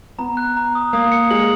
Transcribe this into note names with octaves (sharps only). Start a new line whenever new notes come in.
B3 A#5
F#6
A#5
D#6
A#3 D#6
C#7
G#3 F#7